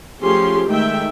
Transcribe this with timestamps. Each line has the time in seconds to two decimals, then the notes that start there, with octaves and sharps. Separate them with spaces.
0.21 F3 A3 C#4 G4 G#4 C6
0.69 D#3 G#3 A3 E5 G5